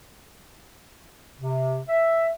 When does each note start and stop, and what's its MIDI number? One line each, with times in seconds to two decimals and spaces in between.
1.40 1.78 48
1.89 2.29 76